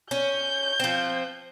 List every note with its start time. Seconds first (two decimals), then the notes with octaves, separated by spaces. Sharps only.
0.11 C#4 G6
0.80 F3 C4